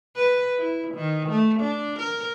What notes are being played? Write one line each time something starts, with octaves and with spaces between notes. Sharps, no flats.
B4
E4
D#3
A3
D4
A#4